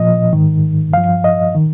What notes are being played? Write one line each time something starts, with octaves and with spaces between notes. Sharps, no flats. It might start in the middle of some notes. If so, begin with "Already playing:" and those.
Already playing: A#2 F3 D#5
G#2 D#3
G2 F3 F5
D#5
D#3